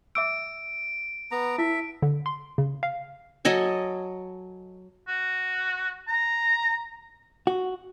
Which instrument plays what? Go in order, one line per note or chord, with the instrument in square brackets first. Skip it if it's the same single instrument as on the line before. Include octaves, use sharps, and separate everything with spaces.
[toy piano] E5 D6 E6 [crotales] D7
[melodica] B3 A#5
[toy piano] E4 [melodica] E5
[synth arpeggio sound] D3
C6
C#3
F5
[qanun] F#3 A4 D#5 G#5
[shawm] F#4
A#5
[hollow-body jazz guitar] F#4